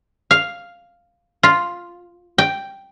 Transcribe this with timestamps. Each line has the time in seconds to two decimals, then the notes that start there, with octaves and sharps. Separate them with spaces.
0.31 F5
1.43 F4
2.38 G5